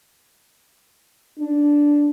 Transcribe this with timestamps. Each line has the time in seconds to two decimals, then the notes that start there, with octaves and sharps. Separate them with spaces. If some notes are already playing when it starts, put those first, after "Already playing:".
1.39 D4